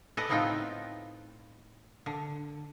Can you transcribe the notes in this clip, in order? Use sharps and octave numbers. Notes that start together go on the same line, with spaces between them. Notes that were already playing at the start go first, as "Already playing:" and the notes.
A4 B4 D5 D#5
A2 B3 C4 D#4 F4 G5
D3